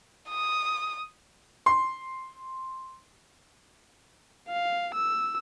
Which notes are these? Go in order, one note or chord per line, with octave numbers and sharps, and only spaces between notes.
D#6
C6
F5
E6